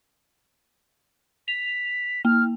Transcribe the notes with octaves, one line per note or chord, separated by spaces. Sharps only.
B6 F7
A#3 F6